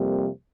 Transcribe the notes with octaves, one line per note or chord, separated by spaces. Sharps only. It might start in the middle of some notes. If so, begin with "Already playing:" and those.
Already playing: F2 C3 G3 A#3